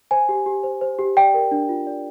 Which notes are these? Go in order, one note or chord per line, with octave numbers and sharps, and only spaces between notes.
C5 G#5
G4
G4
C5
C5
G4
D5 G5
A#4
D4
F4
D5